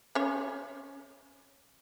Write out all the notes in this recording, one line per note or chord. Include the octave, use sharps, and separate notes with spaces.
C#4 C#5